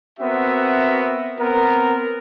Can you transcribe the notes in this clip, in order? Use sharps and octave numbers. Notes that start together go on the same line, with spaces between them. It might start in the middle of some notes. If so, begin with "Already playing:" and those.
B3 C4 F#4 A#4 E5
B3 C4 A#4